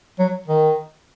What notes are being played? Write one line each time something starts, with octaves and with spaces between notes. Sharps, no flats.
F#3
D#3